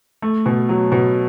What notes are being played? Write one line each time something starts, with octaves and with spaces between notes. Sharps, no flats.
A3
B2
F#3
B2